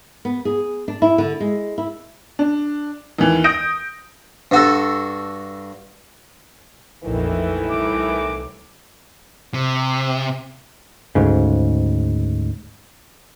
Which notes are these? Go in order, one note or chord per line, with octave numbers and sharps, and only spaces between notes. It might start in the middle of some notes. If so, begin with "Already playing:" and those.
B3
G#4
D4
E4
D3
G#3
E4
D4
D#2 E3
D#6 G6 A#6 D7
G2 F#4 A4
A#1 F2 A2 D#3 E3
C2 D6
C3
D2 G#2 C#3